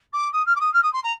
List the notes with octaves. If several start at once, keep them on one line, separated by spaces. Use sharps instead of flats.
D6
D#6
F6
D6
D#6
F6
D#6
C6
A#5